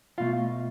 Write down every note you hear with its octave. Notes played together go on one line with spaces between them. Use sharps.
B2 A3 F4 F5